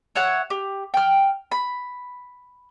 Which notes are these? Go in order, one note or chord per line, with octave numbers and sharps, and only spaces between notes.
C#5 E5 F#5 F#6
G4
G5 F6
B5